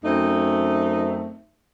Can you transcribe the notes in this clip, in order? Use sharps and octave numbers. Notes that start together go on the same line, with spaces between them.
F#2 A3 C4 D#4